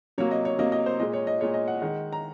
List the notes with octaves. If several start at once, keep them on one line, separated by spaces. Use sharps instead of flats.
C3 F#3 A#3 C#5
D#5
C#5
C3 F#3 A#3 D#5
D#5
C5
A#2 G#3 D#5
C#5
D#5
A#2 G#3 C#5
D#5
F#5
D#3 G#3
A#5